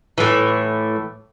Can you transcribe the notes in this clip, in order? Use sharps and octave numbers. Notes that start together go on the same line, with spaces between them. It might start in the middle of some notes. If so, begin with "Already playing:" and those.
A2 E3